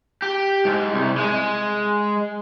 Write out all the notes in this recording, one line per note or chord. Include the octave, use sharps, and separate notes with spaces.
G4
G#2
C2
G#3